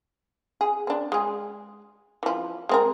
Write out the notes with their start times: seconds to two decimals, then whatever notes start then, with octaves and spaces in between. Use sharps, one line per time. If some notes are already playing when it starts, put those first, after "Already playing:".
0.61 G#4
0.87 C4 D4
1.12 G#3 G#4
2.23 E3 F3
2.69 G#3 C4 A#4